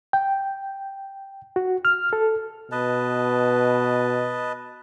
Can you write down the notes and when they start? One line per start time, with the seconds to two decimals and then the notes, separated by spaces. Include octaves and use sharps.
0.13 G5
1.56 F#4
1.85 F6
2.13 A4
2.72 B2 B4 D#5 A5